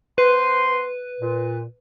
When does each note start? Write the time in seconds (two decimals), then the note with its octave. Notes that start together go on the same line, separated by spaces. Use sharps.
0.18 B3 B4 C5 C6
1.21 A#2